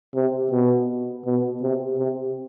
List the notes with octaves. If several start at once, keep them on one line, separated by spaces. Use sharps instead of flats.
C3
B2
B2
C3
C3